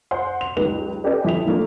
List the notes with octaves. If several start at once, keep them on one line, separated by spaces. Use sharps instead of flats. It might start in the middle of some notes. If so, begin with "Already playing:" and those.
C5 F#5 C6
F7
F#1 C#2 D#3 G4 B4 F7
C#4 G4 A4 B4 D5 D#5
F2 E4 B6 F7
E3 F3 A3 A#3 D4